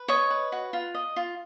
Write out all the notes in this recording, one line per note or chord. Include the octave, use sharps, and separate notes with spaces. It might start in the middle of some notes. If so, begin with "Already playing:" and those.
Already playing: B4
C#5 D#5 C#6
B4
F#4
F4
D#5
F4